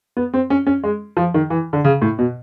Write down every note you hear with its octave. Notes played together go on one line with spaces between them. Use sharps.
B3
C4
C#4
C#4
G#3
F3
D#3
E3
D3
C#3
A2
B2